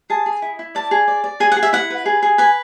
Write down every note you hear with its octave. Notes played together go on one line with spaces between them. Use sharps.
G#4 A5
G#4
E4
E4
D5 A5
G#4
D5
D5
G#4 G#5
F#5
G#4
E5
E4 F#5
B4
G#4
G#4
B4 G#5